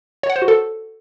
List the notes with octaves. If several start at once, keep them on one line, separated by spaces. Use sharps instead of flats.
C#5
F#5
C5
F#4
A4